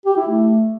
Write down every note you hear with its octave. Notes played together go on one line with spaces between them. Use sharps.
G4
E4
A3